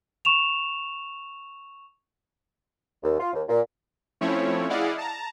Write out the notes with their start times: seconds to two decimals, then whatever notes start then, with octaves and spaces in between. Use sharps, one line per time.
0.25 C#6 E7 F7
3.03 D#2
3.20 F4
3.33 D#2
3.49 A#2
4.21 F3 A3 C4 C#4 E4 C#5
4.70 E4 G#4 D5 D#5 F5 F#5
4.98 A5 A#5